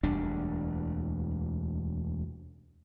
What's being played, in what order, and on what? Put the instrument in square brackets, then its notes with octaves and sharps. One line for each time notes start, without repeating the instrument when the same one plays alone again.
[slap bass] E1 D2 G3 D4